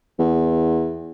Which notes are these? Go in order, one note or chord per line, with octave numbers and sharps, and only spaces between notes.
E2